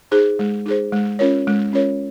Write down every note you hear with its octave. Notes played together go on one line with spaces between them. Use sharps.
D#4 G#4 C5
G#3
D#4 G#4 C5
G#3
C#4 F4 A#4 C#5
G#3
C#4 F4 A#4 C#5